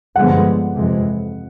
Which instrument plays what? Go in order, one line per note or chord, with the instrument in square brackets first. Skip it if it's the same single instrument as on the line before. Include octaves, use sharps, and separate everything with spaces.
[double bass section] G2 D3 F3 G#3 B3 [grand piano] F#5
[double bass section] F2 C3 E3 G#3